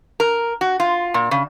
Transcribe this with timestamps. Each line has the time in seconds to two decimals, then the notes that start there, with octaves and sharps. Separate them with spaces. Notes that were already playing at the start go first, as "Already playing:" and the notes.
0.20 A#4
0.61 F#4
0.80 F4
1.14 A#2
1.31 C#3